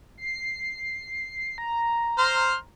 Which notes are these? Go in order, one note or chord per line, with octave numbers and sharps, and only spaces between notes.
C7
A#5
C5 C6 F6